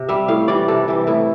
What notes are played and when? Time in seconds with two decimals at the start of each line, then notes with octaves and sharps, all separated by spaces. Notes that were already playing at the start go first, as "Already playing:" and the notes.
Already playing: C3
0.09 G3 E5
0.28 A2 F5
0.48 E3 G3 D5
0.68 C3 A4
0.88 E3 G3
1.07 A2 E4